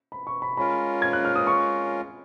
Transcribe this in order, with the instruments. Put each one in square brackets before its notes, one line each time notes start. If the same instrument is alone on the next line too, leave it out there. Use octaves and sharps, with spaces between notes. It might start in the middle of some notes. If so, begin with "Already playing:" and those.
[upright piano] B5
C#6
B5
[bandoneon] G#3 C#4 F4 A#4 [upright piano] B5
[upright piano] G#6
F#6
F6
D#6
C#6